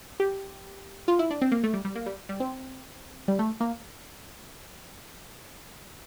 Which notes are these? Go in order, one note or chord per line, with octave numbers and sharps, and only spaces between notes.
G4
F4
E4
D4
C4
A#3
A3
G3
G3
A#3
G3
G3
C4
G3
A3
A#3